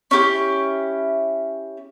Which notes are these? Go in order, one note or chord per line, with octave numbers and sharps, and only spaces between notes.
C#4 E4 G4